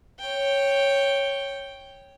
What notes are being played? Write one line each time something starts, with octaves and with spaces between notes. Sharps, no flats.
C#5 G5